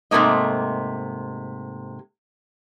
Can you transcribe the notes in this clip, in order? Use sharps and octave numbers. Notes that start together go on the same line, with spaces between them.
G#2 C3 A3 A#3 D#5